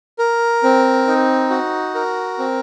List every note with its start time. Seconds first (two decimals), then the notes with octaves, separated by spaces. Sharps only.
0.19 A#4
0.63 C4
1.07 D#4
1.50 F#4
1.95 A#4
2.39 C4